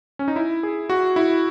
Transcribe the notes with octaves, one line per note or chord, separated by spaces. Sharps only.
C#4
D#4
E4
G#4
F#4
E4